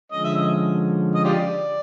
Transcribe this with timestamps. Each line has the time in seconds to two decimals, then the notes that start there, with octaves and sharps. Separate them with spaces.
0.11 D3 F3 G#3 C#4 D#5
0.24 E5
0.37 D#5
1.15 D#5
1.24 F4 G4 D5